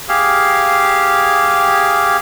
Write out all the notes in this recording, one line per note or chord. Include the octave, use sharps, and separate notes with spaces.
G4 G#4 F5